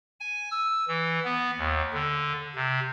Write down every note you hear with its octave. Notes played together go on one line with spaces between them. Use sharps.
G#5
E6
E3
B3
D#2
D3
C3